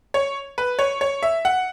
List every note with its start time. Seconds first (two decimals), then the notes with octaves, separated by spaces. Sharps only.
0.14 C#5
0.58 B4
0.79 C#5
1.01 C#5
1.23 E5
1.45 F#5